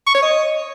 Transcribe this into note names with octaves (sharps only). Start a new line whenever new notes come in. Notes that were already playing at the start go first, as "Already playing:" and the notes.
C#6
C#5
D#5